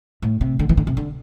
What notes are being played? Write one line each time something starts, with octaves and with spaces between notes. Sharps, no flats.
A2
C3
D3
E3
D3
C3
D3